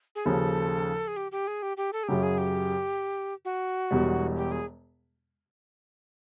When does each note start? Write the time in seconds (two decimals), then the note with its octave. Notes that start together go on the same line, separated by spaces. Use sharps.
0.15 G#4
0.25 D#2 C#3 F3 A4
1.08 G#4
1.16 G4
1.32 G4
1.47 G#4
1.62 G4
1.77 G4
1.93 A4
2.03 G#4
2.08 F#2 C#3 F#3 G4
2.23 G#4
2.38 G4
3.45 F#4
3.91 E1 E2 B2 G3
4.37 G4
4.52 G#4